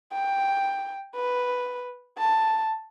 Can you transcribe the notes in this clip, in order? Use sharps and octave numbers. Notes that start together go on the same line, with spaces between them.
G5
B4
A5